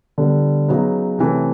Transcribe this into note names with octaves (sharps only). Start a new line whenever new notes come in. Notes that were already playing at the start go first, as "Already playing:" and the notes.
D3 G3 B3
C#3 F#3 B3 D#4
C3 E3 A3 C#4